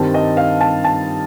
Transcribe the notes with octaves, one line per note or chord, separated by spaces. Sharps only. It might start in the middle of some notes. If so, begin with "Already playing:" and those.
Already playing: G2 D#3 G3 C4 A5
D#5
F5
A5
A5